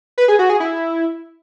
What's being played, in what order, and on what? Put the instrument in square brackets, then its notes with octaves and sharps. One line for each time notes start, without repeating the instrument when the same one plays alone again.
[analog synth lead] B4
G#4
F#4
G#4
E4